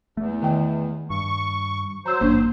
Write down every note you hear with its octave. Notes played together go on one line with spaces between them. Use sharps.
E2 A3
D#3 G5
G2 C#6
F#3 C5 A#5 E6
G#1 G2 A#3 D4